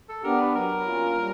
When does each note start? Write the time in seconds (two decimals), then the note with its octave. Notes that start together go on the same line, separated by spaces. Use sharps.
0.09 A4
0.24 B3 D4 G4 A#4
0.40 B4
0.55 F#3 A#4
0.86 A#3 C#4 F4
1.18 G3